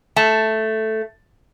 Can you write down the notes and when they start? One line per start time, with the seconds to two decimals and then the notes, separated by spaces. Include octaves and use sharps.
0.16 A3 A5